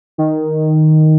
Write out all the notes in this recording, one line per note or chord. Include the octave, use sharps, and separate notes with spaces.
D#3